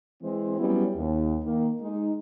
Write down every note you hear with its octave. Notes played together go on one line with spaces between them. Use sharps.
E3 G#3 C4
F#3 G3 B3 C#4 E4
D#2
D#3 A#3
G#3 D#4